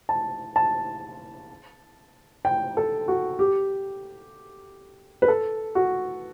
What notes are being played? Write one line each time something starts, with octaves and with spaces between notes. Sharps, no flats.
A5
A5
G5
A4
F#4
G4
B4
A4
F#4